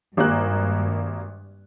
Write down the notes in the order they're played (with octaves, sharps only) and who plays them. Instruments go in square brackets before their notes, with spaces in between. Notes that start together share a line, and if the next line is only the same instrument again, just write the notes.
[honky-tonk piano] G#1 A#3 F#6 [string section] G2